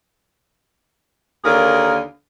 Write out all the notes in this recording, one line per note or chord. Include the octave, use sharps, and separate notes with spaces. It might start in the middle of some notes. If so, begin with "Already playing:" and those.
D#2 D3 G#4 A#4 F5